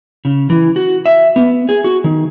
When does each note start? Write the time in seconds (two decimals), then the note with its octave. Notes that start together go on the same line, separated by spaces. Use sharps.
0.25 C#3
0.50 E3
0.76 F#4
1.06 E5
1.36 B3
1.69 G#4
1.84 F#4
2.04 D#3